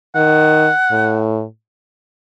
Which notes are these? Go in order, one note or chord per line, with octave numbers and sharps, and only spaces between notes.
D#3 F#5
A2